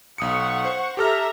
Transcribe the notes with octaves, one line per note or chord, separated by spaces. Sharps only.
B1 F#5 C#6 D#6 C#7
C5
G4 A4 E5 A#5 F6